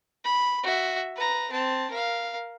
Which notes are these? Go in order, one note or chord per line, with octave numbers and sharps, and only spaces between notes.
B5
F#4 E5
B4 A#5
C4 A5
A#4 F5